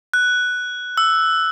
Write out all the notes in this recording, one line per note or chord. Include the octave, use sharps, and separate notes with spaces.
F#6
E6